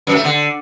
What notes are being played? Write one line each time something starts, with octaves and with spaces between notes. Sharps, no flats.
F#2
A3
D3